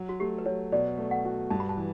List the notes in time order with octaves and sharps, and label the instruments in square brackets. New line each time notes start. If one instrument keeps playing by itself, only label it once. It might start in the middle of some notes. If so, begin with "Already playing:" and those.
Already playing: [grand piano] F#3
[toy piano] F#4
[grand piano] A3 [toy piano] G4
[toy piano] B4
[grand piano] F#3 [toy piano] C#5
[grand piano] B2 [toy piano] D5
[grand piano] A3
[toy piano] F#5
[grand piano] F#4
[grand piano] G2 [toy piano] A5
[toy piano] B5
A5
[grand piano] E3